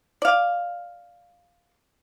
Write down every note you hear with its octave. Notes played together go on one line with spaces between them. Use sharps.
D5 F5